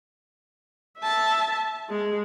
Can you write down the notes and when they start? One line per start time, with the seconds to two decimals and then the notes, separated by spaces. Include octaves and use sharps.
0.99 E5 A5
1.89 G#3 G#4